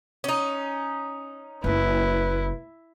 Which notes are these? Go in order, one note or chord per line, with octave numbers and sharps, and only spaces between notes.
C#4 D#4
F#1 A#3 E4 B4